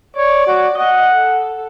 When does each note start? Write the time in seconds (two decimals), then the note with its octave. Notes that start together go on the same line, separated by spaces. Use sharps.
0.16 C#5 D5
0.47 F#4
0.78 D#5 F#5
1.13 A4